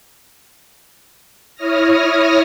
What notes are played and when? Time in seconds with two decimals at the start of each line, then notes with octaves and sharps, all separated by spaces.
1.56 E4 C#5 D#6 F6 A#6